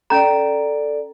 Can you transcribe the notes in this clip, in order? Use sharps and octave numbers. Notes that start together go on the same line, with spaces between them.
C#4 A4 D5 A#5